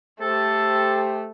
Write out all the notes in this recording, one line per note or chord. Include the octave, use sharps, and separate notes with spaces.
A3 G4 A4 C5